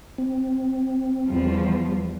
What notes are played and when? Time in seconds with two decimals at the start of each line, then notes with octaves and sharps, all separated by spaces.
0.18 C4
1.27 E2 F3 G3